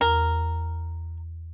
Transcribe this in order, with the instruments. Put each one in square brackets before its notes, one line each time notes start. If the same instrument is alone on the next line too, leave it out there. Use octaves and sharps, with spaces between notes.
[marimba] E2 [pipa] A#4